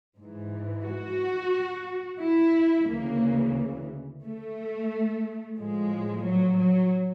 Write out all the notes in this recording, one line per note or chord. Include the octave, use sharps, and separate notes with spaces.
G#2
E3
F#4
E4
D2 C#3 E3 A#3
A3
A2 F3 G#3
F#3
F#3